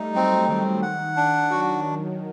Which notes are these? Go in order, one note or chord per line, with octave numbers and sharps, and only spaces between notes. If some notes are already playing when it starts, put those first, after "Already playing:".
Already playing: G3 A3 D#4
F#3 C4
D#3 C4
F#5
D4
F#3 F#4